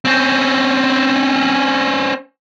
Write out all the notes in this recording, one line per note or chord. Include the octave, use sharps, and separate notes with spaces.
C4 C#4